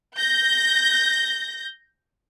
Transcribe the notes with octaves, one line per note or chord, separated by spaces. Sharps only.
G6 A#6